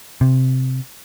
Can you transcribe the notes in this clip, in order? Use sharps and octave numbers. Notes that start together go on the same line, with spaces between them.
C3